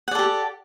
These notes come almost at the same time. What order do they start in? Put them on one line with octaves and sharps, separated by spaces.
F#5 D5 A4 G4